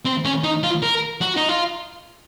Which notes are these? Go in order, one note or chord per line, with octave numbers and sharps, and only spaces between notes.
C4
C#4
D#4
F4
A#4
F#4
D#4
F4